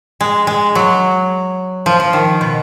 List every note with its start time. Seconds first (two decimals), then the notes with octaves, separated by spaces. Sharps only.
0.21 G#3
0.47 G#3
0.75 F#3
1.86 F3
2.00 F3
2.13 D#3
2.41 B2